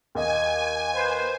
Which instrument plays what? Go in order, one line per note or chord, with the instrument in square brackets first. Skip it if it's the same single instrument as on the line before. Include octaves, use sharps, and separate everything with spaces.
[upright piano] D#2 D#5 [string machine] G#5
[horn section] B4 C5